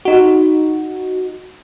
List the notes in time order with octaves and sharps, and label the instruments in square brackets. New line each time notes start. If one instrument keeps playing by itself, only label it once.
[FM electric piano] D#4 F#4